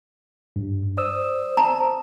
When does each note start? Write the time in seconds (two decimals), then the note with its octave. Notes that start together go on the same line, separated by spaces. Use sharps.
0.56 G2
0.97 C5 D5 D#6 E6
1.57 A5 A#5